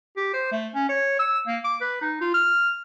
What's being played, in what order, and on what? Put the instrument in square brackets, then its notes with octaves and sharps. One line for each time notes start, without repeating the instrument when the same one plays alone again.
[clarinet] G4
C5
A3
C#4
C#5
E6
A#3
D6
B4
D#4
F4
F6